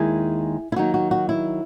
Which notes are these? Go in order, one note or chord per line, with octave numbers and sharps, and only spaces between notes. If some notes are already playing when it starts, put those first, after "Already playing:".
Already playing: D#2 D#3 G#3 E4 G#4
E4
D#3 F#3 A#3 D#4 F#4
F#4
F#4
E4